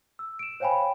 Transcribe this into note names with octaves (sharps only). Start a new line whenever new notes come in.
E6
D7 E7
C5 C#5 F5 G5 G#5 B5